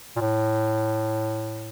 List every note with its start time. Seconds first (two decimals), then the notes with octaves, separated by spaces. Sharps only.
0.16 A#2
0.21 A2